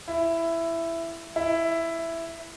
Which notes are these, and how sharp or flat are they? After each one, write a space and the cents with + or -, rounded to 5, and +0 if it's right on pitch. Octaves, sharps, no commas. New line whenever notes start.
E4 +10
E4 +5